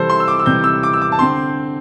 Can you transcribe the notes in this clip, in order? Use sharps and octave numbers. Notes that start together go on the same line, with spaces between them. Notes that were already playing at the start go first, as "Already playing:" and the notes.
Already playing: C3 E3 G3 C4 A4 C5
C6
E6
D6
E6
C3 E3 G3 C4 G6
E6
D6
E6
D6
A5
D3 C4 C6